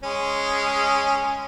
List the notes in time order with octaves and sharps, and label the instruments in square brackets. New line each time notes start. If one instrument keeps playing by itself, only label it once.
[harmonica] G#3 C#4